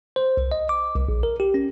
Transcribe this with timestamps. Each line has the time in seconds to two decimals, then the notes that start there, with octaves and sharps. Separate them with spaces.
0.16 C5
0.37 C2
0.52 D#5
0.69 D6
0.96 C2
1.08 A#1
1.23 A#4
1.40 G4
1.54 C#4